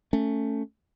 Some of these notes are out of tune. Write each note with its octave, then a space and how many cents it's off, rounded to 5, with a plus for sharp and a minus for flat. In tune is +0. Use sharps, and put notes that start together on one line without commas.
A3 +10 C#4 +0